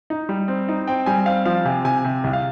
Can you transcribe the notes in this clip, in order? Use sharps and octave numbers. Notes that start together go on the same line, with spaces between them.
D#4
G3
C4
D#4
C4 G5
G3 G#5
C4 F5
F3 F5
C3 G#5
C3 G#5
C3
C2
F5